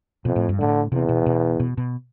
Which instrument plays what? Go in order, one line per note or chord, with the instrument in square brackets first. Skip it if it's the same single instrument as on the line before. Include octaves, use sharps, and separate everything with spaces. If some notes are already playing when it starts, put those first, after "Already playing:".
[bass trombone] F2 [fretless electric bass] B2
[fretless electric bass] A2
G2
[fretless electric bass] A2 [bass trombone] D3
[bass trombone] E2 [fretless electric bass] C3
[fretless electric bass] B2
B2
B2
B2